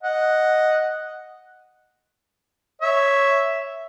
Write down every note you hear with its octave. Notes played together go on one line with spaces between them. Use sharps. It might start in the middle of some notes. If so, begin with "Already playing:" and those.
D#5 F#5
C#5 E5